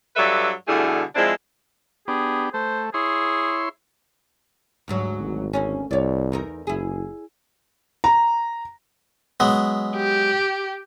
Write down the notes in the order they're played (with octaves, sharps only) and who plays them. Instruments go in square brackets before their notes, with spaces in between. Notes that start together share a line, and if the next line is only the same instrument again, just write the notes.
[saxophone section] G2 F#3 A4 B4 D5 E5
B2 D3 G3 A3 E4 G#4
F3 G#3 C4 D4 E4
[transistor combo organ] B3 D4 G4 [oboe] G#4
[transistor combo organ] A3 [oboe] C5
[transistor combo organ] E4 C#5 C6 [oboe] G#4
[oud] D2 G#2 F#3
[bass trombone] G#1
[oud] D2 A#3 C#4
[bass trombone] C2 [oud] C#5 D5
[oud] E2 D#4 A#4
[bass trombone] F#1 [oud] E4 G#4
[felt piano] A#5
[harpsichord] F#3 G#3 B3
[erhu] G4